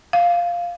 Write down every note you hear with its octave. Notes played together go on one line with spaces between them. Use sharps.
F5